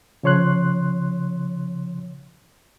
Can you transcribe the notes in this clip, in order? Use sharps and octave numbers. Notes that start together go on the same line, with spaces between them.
C#3 F3 C#5 C6 F#6